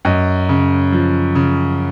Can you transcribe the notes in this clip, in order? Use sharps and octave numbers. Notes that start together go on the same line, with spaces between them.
F#2 D#5
C#3
F3
C#3